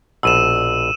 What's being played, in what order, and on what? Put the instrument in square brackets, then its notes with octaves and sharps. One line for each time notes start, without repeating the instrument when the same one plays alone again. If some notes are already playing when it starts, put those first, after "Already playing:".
[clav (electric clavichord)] A#1 B2 [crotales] E6 D#7 E7